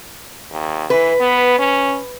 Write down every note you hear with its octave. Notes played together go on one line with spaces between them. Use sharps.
D#2
E3 B4
B3
C#4